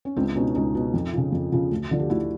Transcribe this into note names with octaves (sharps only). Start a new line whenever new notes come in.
C#4
C#2 C4 D4
B2 C#4 D#4
C#2 C#4 D#4
B2
F2
C#3 F3
F2
C#3 F3
D2
D3 F3
G4
D2 E4 F#4